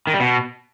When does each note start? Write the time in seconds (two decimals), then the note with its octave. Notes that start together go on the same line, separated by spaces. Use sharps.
0.07 D#3
0.14 G3
0.20 B2